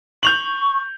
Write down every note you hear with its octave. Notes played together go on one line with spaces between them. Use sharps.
C#6 G6 F7 F#7